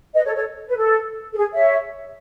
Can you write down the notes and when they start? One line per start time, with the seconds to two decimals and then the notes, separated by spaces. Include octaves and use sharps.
0.15 B4 D#5
0.25 A4 C#5
0.35 A4 C#5
0.68 B4
0.76 A4
1.32 A4
1.37 G#4
1.52 C#5 E5